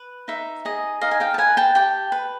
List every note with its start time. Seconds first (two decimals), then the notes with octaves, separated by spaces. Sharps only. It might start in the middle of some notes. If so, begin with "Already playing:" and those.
Already playing: B4
0.28 D#4 E5
0.65 G#4 D#5
1.01 D#4 D#5 F5
1.11 G#5
1.20 F5 G5
1.34 A5
1.38 B4 F#5 G#5
1.57 G5 A5
1.75 G4 G5 A5
2.12 B4